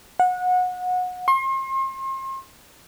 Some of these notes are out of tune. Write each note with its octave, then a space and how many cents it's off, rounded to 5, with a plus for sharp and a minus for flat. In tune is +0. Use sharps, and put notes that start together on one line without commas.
F#5 -25
C6 +40